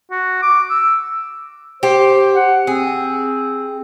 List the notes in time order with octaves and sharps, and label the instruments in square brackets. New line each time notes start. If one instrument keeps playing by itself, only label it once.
[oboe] F#4
D6
E6
[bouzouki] G4 [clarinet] C5
[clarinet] F#5
[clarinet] C4 [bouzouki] G#4